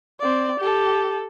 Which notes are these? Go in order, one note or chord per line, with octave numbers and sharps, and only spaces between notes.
C4 D5
G4 A4